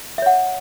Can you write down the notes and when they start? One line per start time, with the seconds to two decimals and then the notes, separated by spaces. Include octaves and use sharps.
0.18 E5
0.22 C#5
0.26 F#5